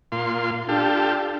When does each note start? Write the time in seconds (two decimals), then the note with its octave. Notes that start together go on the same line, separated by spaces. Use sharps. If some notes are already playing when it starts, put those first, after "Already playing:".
0.12 A#2 F4 C6
0.69 D4 F4 G4 A4